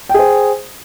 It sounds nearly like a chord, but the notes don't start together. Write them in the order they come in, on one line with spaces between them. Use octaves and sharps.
G5 G#4 C5